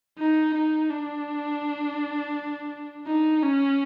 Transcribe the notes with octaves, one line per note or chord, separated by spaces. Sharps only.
D#4
D#4
D4
D#4
C#4